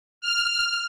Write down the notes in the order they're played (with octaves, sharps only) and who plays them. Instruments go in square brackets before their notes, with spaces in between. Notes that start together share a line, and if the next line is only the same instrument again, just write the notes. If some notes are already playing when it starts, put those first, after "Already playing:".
[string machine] F6